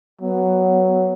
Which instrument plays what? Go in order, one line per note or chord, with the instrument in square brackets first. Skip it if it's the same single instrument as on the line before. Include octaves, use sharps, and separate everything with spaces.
[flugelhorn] F#3 [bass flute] B3